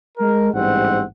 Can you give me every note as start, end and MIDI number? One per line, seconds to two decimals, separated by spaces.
0.18 0.49 56
0.18 0.49 70
0.53 1.03 33
0.53 1.03 44
0.53 1.03 55
0.53 1.03 60
0.53 1.03 78